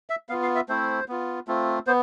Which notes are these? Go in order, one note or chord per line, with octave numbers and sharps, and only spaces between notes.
E5
B3 F4 F5
F5
E5
A3 C4 E4 C5
B3 F4
A3 C4 F4
B3 C5